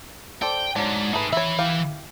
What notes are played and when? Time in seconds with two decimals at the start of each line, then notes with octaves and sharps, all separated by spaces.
0.42 A4 C5 D5 G5
0.76 G#2 F#3 D4
1.13 A3 D#4 G#4 B4
1.32 E3 C#5 E5 B5
1.59 E4 G4 F5